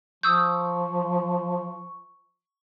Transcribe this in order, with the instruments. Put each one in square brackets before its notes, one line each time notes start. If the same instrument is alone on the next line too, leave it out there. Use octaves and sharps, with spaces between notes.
[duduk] F3 [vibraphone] C#6 [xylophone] D#6 E6 G6